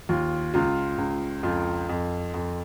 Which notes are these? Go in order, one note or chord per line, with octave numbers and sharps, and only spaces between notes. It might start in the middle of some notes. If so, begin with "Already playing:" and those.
D#2 F4
C#2 F4
C#2
F2 F4
F2
F2